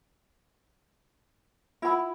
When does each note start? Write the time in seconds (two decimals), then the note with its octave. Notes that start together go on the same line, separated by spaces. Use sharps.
1.82 E4 F4 F#5 B5 E6